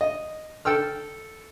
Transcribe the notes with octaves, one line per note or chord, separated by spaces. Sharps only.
D#5
A4 G5 E6 F6